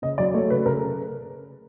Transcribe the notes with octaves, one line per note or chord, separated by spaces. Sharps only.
C#3 D#5
F#3 D5
A3 C#5
C#3 B4
C#3 A#4